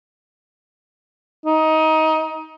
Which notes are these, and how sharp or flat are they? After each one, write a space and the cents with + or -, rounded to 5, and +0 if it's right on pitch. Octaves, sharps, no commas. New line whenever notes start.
D#4 +20